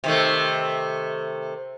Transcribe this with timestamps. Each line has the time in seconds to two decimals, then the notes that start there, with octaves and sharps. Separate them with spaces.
0.04 C3 D#3 A3